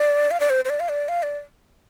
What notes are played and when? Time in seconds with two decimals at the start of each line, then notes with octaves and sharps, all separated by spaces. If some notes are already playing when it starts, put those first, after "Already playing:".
Already playing: D5
0.31 F5
0.40 D5
0.50 C5
0.65 C5
0.69 D5
0.80 F5
0.89 D5
1.09 F5
1.23 D5